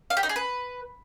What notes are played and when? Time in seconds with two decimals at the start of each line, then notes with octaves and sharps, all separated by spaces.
0.10 F5
0.17 G4
0.23 D#4
0.29 G#4
0.36 B4